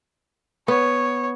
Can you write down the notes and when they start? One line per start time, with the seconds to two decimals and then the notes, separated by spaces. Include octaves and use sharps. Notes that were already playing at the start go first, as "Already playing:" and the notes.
0.68 B3 C#5